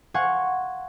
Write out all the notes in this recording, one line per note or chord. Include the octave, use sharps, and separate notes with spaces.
F5 F#5 G#5 C6 C#6